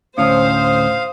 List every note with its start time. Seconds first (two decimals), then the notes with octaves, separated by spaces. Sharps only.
0.18 D2 A2 C#4 C5 F5 D#6